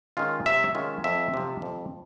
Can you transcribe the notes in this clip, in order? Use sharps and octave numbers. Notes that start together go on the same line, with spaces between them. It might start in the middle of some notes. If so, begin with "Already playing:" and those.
D#3 G#3 C#4 F4
C3 E5
D#3 G#3 C#4 F4
F2 E5
C3 F3
F2